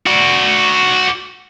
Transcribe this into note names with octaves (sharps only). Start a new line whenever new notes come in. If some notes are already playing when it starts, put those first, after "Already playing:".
F#4 D5